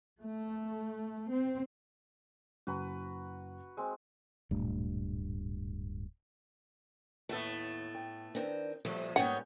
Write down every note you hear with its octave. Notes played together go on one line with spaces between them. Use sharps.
A3
C4
F#1 F#4 B4 A#5
G#3 C4
D1 G2 A#2 A3
D#2 A2 A3 B3 A4
G5
D#3 C4 D4 B4 D5
A#2 F3 G3 A3
G#2 G3 A#3 B3 C#4 C#5 F#5 G5